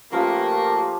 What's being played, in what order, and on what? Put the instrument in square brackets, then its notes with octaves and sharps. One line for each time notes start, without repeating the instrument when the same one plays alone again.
[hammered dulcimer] F3 C#4 F4 [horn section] A3 A#3 [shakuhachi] G4 [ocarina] B4